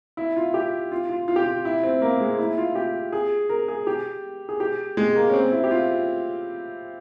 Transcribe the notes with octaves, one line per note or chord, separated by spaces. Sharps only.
E4
F4
G4
F4
F4
F4
G4
F4
E4
C4
A#3
G#3
E4
F4
G4
G#4
A#4
G#4
G4
G#4
G4
G#3
A#3
C#4
C4
E4
G4
F4